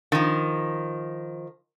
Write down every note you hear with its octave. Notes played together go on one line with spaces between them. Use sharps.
D#3 F3